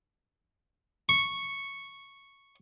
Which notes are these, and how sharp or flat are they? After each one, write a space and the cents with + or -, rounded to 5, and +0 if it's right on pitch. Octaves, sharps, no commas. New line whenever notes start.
C#6 -5